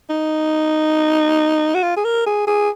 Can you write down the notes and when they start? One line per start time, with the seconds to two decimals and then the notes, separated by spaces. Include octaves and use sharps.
0.10 D#4
1.74 F#4
1.83 F4
1.96 G#4
2.05 A#4
2.26 G#4
2.47 G#4